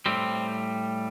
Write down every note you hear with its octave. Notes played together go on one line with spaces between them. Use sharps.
A2 G3 C4